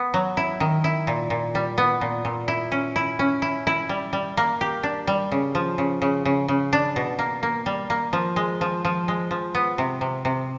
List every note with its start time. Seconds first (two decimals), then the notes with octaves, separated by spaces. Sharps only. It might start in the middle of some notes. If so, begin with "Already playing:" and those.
Already playing: B3
0.14 F#3
0.37 E4
0.60 D#3
0.84 E4
1.07 A#2
1.30 A#2
1.55 G3
1.78 B3
2.01 A#2
2.25 A#2
2.48 E4
2.72 C#4
2.96 E4
3.19 C#4
3.42 E4
3.67 E4
3.89 G3
4.13 G3
4.37 A#3
4.61 G4
4.83 D4
5.07 G3
5.32 C#3
5.55 F3
5.78 C#3
6.02 C#3
6.25 C#3
6.48 C#3
6.73 D4
6.96 B2
7.19 A#3
7.43 A#3
7.66 G3
7.90 A#3
8.13 F3
8.36 G#3
8.61 F3
8.85 F3
9.08 G#3
9.31 F3
9.55 B3
9.78 C3
10.01 C3
10.25 C3